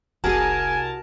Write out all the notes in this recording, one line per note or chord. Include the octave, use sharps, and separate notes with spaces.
F1 C2 F#4 G#4 A#4 G#5 A5